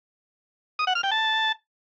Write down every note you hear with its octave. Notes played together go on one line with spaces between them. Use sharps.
D#6
F#5
F6
G5
A5